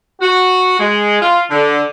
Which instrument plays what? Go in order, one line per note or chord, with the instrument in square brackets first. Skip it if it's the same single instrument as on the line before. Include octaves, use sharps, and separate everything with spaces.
[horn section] F#4
G#3
F4
D3